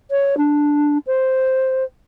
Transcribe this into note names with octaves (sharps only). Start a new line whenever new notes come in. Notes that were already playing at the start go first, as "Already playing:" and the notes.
C#5
D4
C5